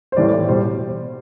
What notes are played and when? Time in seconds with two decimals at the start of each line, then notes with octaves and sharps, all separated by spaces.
0.12 C5
0.17 A2 E3 G3 D5
0.48 B2 G3 C5